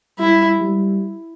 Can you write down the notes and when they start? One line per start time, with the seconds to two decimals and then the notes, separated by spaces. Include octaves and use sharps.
0.19 G3 E4
0.61 G3